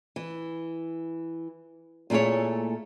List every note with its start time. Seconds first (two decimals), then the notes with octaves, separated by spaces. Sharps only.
0.16 E3
2.10 A#2 A3 E4 G#4 C#5